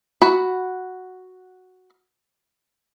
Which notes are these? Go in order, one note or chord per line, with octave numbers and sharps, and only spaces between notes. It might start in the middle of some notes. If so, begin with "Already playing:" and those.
F#4 F#5 B5